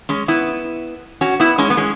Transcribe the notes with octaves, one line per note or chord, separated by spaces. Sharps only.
G#3 C#4
B3 E4
C#4 F#4
B3 E4
G#3 C#4
B3
G#3 C#4